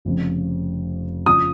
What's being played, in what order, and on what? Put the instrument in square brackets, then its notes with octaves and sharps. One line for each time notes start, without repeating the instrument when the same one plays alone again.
[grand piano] F1 F2 C#3
[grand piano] C#3 F3 [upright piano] D#6